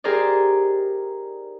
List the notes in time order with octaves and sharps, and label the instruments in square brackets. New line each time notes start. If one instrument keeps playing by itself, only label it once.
[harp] D#4 G4 G#4 A#4 C5 D5